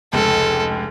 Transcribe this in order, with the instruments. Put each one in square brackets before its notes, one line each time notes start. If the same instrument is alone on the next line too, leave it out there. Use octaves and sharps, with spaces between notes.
[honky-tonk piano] F1 C#2 [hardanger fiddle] A4